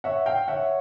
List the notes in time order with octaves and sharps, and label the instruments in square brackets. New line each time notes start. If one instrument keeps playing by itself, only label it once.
[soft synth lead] C#5 [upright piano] E5 F#5
[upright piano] F5 G5
[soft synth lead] C#5 [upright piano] E5 F#5